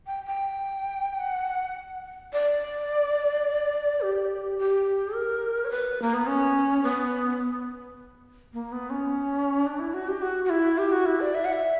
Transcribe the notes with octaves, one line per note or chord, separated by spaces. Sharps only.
G5
G5
F#5
D5
G4
G4
A#4
C#5
B4
A#3
B3
C#4
B3
A#3
B3
C#4
D4
E4
F#4
G4
F#4
F#4
E4
G4
F#4
E4
D5
E5
F#5
E5